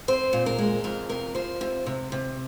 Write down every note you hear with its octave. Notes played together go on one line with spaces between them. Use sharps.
C4 C5
A#2
A#4
G#3
F2 A#4
C3 A#4
F3 C5
C3
C3
C3